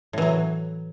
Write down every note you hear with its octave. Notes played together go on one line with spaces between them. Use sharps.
A2 E3 F#3